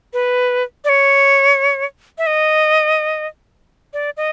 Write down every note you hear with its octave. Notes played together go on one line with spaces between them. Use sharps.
B4
D5
C#5
E5
D#5
D5
D#5